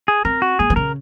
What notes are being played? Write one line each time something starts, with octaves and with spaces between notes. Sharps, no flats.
G#4
C4 A#4
F#4
A#3 G#4
D#3
C#3 A#4